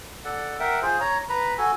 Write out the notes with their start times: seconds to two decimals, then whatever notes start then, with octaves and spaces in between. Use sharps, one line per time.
0.25 A4 D5 F#5
0.60 A#4 E5 F#5 G5
0.82 F4 G#4 C5
1.00 C#5 A#5
1.29 B4 A#5 B5
1.58 F#4 A4 G#5